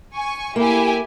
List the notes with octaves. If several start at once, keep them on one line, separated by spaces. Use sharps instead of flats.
G#5 C#6
A#3 E4 G4 G#5